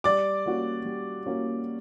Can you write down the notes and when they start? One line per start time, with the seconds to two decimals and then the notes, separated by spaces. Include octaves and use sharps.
0.04 G3 D5 D6
0.46 A#3 C#4 F#4
0.85 G3
1.26 A#3 C#4 F#4